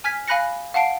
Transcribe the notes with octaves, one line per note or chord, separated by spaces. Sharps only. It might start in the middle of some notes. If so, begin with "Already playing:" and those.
G#5 F6 G#6 B6
F5 G#5 B5 F#6 A#6 C#7
F5 F#5 A5 C7 D7